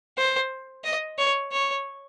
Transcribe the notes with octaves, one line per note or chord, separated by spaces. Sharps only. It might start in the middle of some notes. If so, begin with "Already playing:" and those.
C5
D#5
C#5
C#5